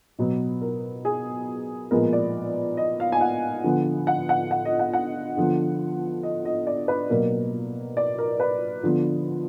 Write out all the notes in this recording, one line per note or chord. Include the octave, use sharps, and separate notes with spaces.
B2 F#3 B3
A#4
G#4
A#2 F3 G#3 B3 A#4
D5
D#5
F5
G#5
F#5
D3 F3 B3
F#5
F#5
F#5
D#5
F#5
F#5
D3 F3 B3
D#5
D#5
D5
B4
B2 F#3 A#3 A#4
D5
A#4
B4
D3 F3 B3